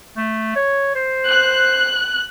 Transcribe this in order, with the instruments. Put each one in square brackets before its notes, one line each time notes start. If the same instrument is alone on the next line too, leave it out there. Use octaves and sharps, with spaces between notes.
[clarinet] A3
C#5
C5
[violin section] F#6